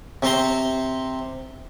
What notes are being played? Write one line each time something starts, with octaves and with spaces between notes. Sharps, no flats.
C3 C4 C5 A#5 C6